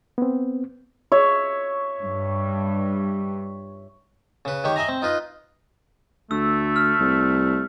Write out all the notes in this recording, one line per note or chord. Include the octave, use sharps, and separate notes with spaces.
B3 C4
C#5 E5
G2
C#3 B4
D#3 G4 C#5
D#5 E5 G#5 A#5
C4
D#4 F4 B4 D#5
D2 A3 E6
F6
C2